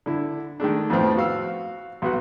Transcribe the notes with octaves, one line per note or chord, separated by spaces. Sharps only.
D3 E4
D#3 G#3 A3 D4
F2 A2 F3 B3 C4
F#4 F5 E6
B1 B3 F#4